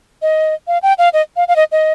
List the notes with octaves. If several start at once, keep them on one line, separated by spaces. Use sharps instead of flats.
D#5
F5
G5
F5
D#5
F5
F5
D#5
D#5